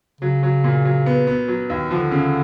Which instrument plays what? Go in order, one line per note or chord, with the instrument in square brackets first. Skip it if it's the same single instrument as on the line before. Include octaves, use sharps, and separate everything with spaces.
[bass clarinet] C#3 [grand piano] F#3
[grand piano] F#3
A#2
F#3
B3
B3
F#3
D#2
[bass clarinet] D3 [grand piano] F3
[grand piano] C#3